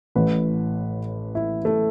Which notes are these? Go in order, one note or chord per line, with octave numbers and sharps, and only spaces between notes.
A1 A2 E3 B4
E4
A3